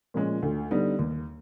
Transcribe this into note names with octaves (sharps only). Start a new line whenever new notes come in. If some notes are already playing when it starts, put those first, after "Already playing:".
A#2 F3 G#3 C#4
D2
D3 G3 B3 D#4
D#2